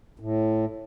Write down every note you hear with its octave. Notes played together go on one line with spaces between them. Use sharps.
A2